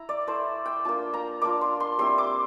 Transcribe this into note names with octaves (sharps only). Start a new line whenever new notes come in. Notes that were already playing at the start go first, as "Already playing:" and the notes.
Already playing: E4 A#5
D5
A3 E4 C5
G5
A#3 D4 F4 A5
A#5
A#3 D4 F4 D6
C6
C6
G3 C4 E4 C6
D6